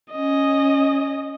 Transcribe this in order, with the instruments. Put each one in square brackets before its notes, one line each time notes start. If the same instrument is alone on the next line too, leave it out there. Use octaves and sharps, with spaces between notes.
[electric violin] C#4 D#5